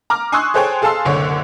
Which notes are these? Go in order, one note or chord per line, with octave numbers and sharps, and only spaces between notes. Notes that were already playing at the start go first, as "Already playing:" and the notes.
A#5 D6 F6
G#5 C6 C#6 D#6 E6 F#6
G#4 A4 C5 C#5 G5 G#5
G#4 A4 F5 A5 C6 E6
F#1 C2 D3 C#5